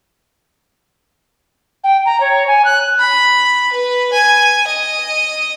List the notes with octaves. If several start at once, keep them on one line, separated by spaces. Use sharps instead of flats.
G5
A#5
C#5
G#5
F#6
B5
B4
G#5
D#5